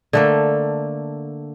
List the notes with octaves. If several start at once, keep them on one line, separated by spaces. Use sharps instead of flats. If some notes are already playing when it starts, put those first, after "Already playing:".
D3 A3 A#3